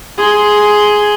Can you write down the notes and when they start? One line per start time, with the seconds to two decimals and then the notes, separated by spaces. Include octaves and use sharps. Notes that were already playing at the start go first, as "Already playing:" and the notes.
0.18 G#4 C6